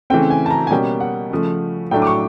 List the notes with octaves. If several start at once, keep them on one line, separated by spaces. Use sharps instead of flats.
C#3 E3 A3 C4 G5
G#5
A5
A#5
G#5
B2 G3 A#3 C#4 G5
F#5
C#3 F3 A3
A2 F#3 A3 D4 G5
D6
C#6